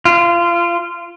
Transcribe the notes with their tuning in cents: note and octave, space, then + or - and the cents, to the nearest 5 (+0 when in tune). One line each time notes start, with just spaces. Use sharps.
F4 -25